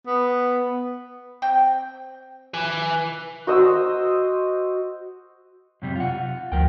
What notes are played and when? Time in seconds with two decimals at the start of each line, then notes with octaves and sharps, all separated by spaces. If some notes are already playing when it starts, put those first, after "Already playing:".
0.07 B3
1.42 C4 G5
2.54 B4 G#5
3.47 F#4 C5 D#5 E6
5.82 F#2 C3 G3
5.96 F4 F#5
6.52 D2 F3 A#4 G5